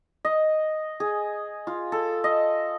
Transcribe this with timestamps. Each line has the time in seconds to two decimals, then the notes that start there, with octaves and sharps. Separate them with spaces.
0.25 D#5
1.00 G#4
1.67 F4
1.92 A4
2.24 D#5